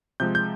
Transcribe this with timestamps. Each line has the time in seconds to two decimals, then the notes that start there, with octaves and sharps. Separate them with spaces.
0.20 C3 F3 G#3 G6
0.35 G6